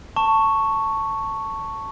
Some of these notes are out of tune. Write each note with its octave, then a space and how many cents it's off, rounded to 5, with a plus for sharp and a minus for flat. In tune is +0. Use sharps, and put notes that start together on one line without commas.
A5 +15 C#6 +0